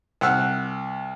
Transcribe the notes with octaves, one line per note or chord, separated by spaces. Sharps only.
C2 F#5 E6 F6